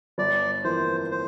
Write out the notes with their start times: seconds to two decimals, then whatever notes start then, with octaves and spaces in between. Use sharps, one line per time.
0.18 G1 D5
0.64 F2 E3 A#3 C5
1.11 C5